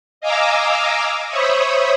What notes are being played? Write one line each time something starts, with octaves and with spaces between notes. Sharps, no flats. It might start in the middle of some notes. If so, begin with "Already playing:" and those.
D#5 F5 G#5 A#5 D6 E6
C5 C#5 E5 B5 C#6 D#6